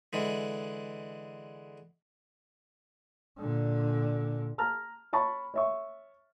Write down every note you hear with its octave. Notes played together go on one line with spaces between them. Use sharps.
D3 E3 G#3
A#2 D3
A5 A#5 F6
C#5 A5 B5 C#6
C#5 E5 C#6